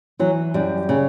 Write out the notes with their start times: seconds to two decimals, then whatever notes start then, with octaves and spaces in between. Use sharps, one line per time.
0.19 E3 F#3
0.54 F#2 G3
0.89 C#3